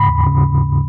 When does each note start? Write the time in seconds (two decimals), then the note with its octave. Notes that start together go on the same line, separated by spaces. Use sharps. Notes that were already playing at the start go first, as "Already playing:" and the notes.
Already playing: G#2 C#3 B5
0.08 D#2
0.27 C#3